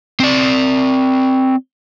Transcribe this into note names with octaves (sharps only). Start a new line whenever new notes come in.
C4 D5